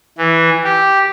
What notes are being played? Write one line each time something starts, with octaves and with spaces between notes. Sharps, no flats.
E3
G4